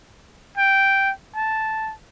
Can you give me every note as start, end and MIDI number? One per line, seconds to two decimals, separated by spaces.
0.57 1.11 79
1.36 1.93 81